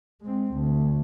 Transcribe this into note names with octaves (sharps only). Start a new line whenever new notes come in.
G#3 C4
D2